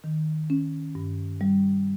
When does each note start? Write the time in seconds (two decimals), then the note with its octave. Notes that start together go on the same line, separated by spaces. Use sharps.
0.04 D#3
0.50 C#4
0.95 G2
1.41 G3